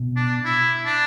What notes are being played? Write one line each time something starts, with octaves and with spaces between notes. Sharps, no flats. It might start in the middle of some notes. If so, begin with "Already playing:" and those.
Already playing: B2
D4
E4
D4